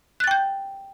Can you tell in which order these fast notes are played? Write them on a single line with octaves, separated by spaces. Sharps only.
F#6 A6 G5 G6